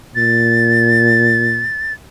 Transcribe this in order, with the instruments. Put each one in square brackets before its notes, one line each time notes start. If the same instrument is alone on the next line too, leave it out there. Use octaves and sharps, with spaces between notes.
[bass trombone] A#2 [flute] A6